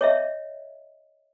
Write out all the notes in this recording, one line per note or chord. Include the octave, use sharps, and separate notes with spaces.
C#5 D#5 E5